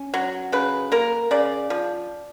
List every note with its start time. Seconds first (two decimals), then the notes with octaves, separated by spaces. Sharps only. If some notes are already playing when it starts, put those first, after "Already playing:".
Already playing: C#4
0.14 F#3
0.52 C#3 B4
0.92 A#3 A#4
1.31 C#3 D5
1.70 F3